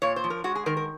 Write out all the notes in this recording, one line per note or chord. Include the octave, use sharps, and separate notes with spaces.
A#2 C#5
C5
F3
A#4
G#3 F#4
G#4
D#3 A#4
A#4